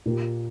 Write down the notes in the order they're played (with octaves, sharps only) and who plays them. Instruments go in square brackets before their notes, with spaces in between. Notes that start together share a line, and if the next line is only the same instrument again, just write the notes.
[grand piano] A#2 A#3 G4